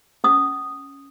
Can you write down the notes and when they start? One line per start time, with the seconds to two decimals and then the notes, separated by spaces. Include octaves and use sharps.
0.24 C#4 D#6